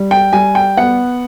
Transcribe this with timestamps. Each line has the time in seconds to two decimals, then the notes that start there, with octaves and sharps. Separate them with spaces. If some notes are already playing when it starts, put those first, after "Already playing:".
Already playing: G3
0.11 G5
0.33 G3 G#5
0.55 G5
0.77 B3 F#5